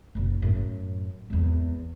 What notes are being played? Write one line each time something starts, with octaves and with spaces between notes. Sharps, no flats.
F#1 B1
F#2 A2
G#1 E2